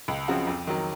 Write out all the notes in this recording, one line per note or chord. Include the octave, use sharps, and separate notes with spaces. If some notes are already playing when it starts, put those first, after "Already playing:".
C#2
C#3 F3 C4 F#4
F2
D#3 F#3